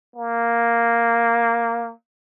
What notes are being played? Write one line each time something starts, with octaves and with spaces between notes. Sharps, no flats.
A#3